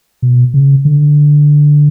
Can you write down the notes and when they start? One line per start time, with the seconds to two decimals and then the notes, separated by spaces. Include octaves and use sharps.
0.22 B2
0.54 C#3
0.85 D3